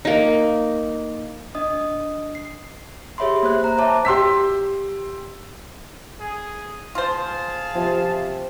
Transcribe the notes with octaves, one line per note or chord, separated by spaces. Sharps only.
A#3 D#4
D4 D#5 D#6
C7
G4 G#4 C#5 E5 B5 C6
A#3 C5 F#6
A#5
C5 C#5 E5 A5 D6
G4 C6 E6 B6
G#4
F4 G#4 C5 F5 A5
C3 F3